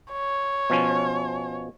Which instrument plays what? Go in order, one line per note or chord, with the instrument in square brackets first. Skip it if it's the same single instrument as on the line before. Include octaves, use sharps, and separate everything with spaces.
[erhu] C#5
[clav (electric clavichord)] B2 F3 C#4